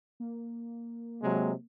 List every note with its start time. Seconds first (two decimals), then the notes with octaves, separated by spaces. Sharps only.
0.20 A#3
1.22 C3 F#3 G#3